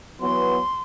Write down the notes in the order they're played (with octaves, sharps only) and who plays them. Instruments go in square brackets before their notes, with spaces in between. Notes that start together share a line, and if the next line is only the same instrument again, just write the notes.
[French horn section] E3 F#3 B3 [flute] C6